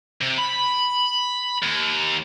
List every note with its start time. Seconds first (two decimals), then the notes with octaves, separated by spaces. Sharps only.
0.22 C3
0.39 B5
1.63 D#2